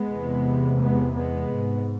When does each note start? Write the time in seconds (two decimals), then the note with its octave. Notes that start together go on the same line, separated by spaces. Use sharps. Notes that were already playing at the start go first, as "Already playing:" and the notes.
Already playing: G#3 B3
0.11 E2 C3
0.80 G#3 B3
1.15 G#3 B3
1.51 G#2